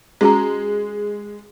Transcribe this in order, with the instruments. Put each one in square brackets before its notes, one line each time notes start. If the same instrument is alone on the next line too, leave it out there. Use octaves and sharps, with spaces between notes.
[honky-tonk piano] G#3 [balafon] C#4 F#4 A#5